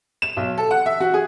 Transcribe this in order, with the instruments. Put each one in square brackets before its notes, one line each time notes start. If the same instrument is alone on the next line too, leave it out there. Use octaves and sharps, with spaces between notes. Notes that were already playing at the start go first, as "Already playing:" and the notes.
[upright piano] E7
B1
A4
F#5
E5
F#4
G#4